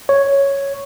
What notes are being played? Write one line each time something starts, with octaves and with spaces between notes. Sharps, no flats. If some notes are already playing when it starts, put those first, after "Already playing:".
C#5